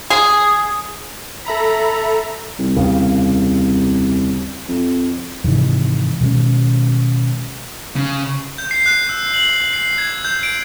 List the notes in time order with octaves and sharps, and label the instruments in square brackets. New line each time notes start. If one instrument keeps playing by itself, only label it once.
[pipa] G#4
[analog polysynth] A4 E5 A#5 B5
[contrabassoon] C2
[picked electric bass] D#2 C#3
[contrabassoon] F2
[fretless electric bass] G#2 C3 D#3 E3
B2 D#3 G#3 C#4
[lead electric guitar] C#3
[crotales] G6
C7
F#6
E6
F#7
C7
G#6
G6
D7